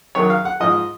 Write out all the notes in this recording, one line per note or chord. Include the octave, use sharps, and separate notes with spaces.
F#2 D#3 F#3 C#5
F5
F#5
G#2 F3 D#5